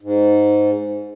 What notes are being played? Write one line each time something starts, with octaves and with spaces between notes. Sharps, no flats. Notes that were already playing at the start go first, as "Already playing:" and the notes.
G#2